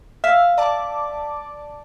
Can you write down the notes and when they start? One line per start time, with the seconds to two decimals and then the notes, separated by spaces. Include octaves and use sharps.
0.24 E5 F5
0.58 D5 A5 D6